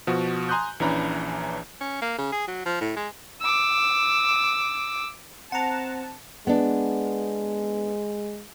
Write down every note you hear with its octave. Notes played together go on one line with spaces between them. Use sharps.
B2 F3 F#4
G#5 A#5 C6 D#6 F#6 G6
A#1 E3 C#4 D4 A#5 B5
C#4
A#3
C#3
G#4
F#3
F3
A2
G#3
D6 E6
C4 C5 F#5 A5 A#5
G#3 B3 D4